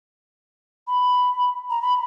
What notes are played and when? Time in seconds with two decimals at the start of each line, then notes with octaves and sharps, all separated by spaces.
0.87 B5
1.70 A#5
1.82 B5